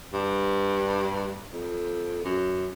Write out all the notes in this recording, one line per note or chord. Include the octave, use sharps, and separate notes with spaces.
G2
F2
F#2